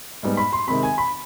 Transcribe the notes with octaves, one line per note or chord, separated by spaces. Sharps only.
G#2 G3 B3
B5
C6
C3 D#3 G#3 C4 B5
G#5
B5